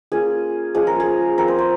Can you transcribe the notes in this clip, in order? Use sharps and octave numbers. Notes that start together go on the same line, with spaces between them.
A#3 C#4 F4 G#4
F3 G#3 C#4 G#4
A#4
G#4
F3 C4 F4 A#4
C5
C5